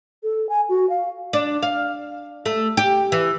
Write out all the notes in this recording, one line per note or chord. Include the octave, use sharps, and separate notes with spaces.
A4
G#5
F#4
F5
D4
F5
A3
G4
E3